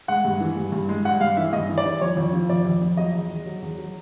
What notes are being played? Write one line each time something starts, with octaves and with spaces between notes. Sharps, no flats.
G#3 F#5
G2
E3
G2
G2
G#3
G3 F#5
G2 F5
E3 E5
G2 D#5
E3
D5
E3
F2 C#5
F2
F3
F2 D5
F2
F2
F#3 D#5
E2
E2
F#3
E2
F#3